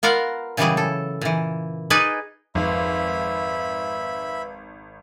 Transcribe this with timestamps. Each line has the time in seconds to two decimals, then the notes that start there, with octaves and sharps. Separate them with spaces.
0.03 B3 F4 A#4 F5 F#5
0.57 A#2 C#3 E3 F#3 G3 G#4
0.77 A4
1.21 A#2 E3
1.90 D#4 G#4 B4 D5 D#5
2.55 G#1 F2 B4 E5 F5 B5